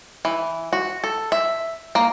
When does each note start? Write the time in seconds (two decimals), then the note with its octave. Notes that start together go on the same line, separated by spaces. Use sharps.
0.25 E3
0.73 F#4
1.04 A4
1.32 E5
1.95 A#3